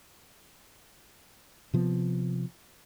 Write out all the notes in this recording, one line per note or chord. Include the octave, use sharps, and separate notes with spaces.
C3 F3 B3